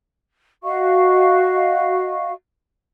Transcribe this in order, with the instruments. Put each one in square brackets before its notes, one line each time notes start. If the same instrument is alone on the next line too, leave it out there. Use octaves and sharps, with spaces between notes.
[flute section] F#4 D#5 F5 C#6